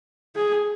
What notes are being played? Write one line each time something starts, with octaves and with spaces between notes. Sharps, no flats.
G#4